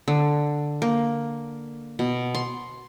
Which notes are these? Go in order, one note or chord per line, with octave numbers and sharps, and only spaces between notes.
D3
A#3
B2
C6